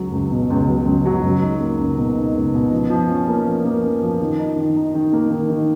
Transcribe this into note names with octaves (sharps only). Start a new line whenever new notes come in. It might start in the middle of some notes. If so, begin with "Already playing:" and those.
Already playing: C#2 F#3
C#2
B2
C#2
F#3
C#2
F#3
C#2
D#4
A#3
C#2
B2
D#4
C#2
B2
F3
F3
C#4
A#3
F3
A#3
C#4
F3
D#3
D#4
D#3
D#4
D#3
A#3
D#3
D#3